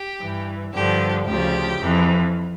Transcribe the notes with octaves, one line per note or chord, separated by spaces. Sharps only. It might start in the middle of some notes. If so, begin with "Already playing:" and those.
Already playing: G4
G2 E3
G2 D3 F3 G4
D2 C#3 F3 G4
F2 E3